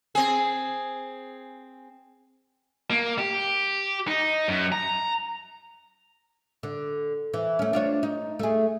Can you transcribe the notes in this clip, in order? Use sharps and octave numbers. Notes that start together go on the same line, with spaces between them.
C4 G#4
A#3
G4
D#4
F#2
A#5
D3
E3
A3 C#4
D4 F4 C#5
D#4
A3 G#4